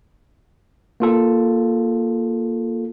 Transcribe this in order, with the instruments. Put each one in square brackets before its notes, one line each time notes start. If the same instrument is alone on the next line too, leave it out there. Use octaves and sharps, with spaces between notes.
[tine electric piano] A#3 F4 A4